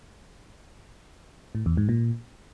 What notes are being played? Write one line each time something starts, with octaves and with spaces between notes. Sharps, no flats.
A2
E2
G#2
A#2